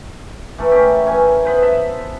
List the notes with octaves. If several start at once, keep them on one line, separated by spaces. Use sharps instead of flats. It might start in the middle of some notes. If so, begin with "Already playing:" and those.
E3 A3 A4 A#4
C#4 G4
E3 C#4 G#5
B3 B4 C5
A4 E5